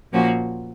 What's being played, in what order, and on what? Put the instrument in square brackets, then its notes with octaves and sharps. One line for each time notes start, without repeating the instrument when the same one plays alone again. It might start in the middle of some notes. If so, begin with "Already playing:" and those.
[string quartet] A#2 F3 A#3 C#4 F#4